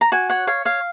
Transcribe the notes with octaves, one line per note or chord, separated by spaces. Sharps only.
A#5
F#4 G#5
C#5 F#5
C#5 F5
C#5 F5